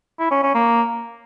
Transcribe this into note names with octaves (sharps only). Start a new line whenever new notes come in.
E4
C#4
C#4
A#3